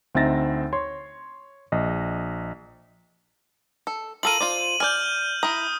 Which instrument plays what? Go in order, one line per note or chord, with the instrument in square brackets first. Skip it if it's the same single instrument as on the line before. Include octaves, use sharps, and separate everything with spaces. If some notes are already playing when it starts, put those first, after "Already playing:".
[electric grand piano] D2 C4 D#4 E5 A6 A#6
C#5 C6
A#1 D#5
[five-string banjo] A4
[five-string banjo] F4 A4 A#4 [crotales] D#7 F#7
[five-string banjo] F4 C5 D5
[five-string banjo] D5 G#5 [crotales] F6 G6
[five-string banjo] E4 A#5 [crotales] D#6